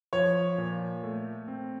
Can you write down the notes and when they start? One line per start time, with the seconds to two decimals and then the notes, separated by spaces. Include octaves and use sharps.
0.13 F3 C#5
0.58 A#2
1.03 A3
1.48 C4